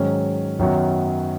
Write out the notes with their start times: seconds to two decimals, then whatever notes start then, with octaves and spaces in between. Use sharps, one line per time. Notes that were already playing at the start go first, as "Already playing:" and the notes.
Already playing: G#2 D#3 F#3 C#4
0.59 F#2 D#3 F#3 B3 F#4